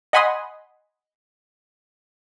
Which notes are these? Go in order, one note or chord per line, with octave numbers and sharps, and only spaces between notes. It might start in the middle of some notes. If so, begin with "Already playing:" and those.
D#5 F#5 G#5 B5 C6 D#6